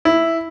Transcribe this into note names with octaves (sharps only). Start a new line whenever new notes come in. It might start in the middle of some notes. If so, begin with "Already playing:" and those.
E4